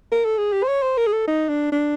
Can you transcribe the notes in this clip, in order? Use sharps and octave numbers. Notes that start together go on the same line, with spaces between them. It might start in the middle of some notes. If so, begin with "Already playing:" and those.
A#4
A4
G#4
G4
C5
C#5
C5
A#4
G#4
A4
D#4
D4
D4